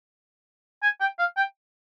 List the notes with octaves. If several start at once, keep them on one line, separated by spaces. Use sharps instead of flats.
G#5
G5
F5
G5